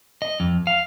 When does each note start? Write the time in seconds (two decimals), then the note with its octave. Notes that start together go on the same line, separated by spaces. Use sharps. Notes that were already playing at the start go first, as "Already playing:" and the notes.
0.22 D#5
0.40 F2
0.67 F5